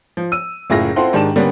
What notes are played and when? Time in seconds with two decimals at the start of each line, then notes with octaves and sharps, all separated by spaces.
0.17 F3
0.32 E6 D#7
0.70 F#1 A2 F4 G#4 E5 A#6
0.96 C4 E4 F4 A4 F#5 C6
1.13 G#2 D#3 D4 G4 A5 E7
1.36 D3 G3 A#3 B3 C#4 D4